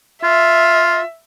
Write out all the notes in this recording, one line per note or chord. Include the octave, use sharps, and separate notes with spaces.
F4 E5